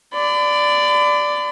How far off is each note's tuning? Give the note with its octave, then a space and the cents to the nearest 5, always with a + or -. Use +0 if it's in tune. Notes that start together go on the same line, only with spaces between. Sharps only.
D5 +0 B5 +40